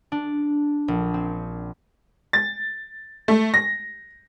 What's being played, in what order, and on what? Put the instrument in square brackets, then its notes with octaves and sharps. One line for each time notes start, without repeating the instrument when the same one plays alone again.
[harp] D4
A#1
C4
[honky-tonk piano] A6
A3
A#6